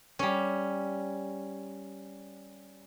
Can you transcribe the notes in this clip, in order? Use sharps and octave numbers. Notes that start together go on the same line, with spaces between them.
G3 C#4